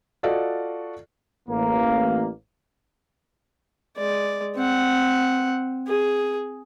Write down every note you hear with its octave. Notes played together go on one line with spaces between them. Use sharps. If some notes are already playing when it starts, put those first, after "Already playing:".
F4 F#4 A4 D5 D#5 F5
A1 A#3
G#3 D5
C4 F#5
G#4